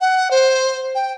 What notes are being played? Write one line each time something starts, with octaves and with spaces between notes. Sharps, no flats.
F#5
C5
G5